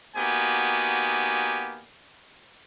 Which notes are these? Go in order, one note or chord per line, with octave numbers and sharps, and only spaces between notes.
A#3 B3 D#4 F#4 G4 G#5